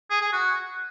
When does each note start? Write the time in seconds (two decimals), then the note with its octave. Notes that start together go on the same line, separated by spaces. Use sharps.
0.10 G#4
0.21 G#4
0.32 F#4